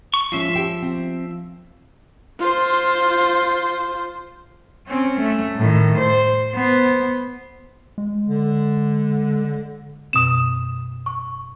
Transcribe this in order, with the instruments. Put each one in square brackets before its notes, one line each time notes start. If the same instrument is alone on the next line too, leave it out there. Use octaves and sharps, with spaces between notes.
[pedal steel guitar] C#6
[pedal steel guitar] F3 E5 [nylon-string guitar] G#3 C#4 F4
[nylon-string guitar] G4 G5
C4
[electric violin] F4 C5
[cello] C4 C#4
A3
A2 D#3
C5
B3 C5
[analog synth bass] G#3
[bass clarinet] D3
[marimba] F#2 B2 C4 [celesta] D#6 E7
[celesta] C#6